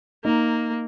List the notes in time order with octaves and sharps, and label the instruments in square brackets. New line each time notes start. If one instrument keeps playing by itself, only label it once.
[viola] A#3 [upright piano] D#4